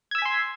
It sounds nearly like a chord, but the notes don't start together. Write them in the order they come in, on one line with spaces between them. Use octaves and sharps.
G#6 E6 B6 G#5 C6